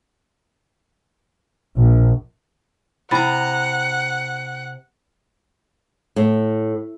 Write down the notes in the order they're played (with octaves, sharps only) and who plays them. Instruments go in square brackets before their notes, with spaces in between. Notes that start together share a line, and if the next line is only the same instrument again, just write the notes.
[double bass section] A#1
[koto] C3 A#5 [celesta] E4 B5 A6 [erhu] F#5
[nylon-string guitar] A2